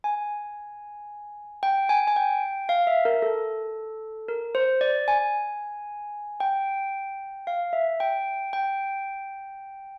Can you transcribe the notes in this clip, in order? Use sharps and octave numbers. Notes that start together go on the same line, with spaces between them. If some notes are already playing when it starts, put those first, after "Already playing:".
G#5
G5
G#5
G#5
G5
F5
E5
A#4
A4
A#4
C5
D5
G#5
G5
F5
E5
G5
G5